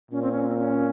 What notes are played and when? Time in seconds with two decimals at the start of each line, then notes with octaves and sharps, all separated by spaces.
0.11 A#2 C#4
0.22 C4
0.32 C#4
0.47 C4
0.58 C#4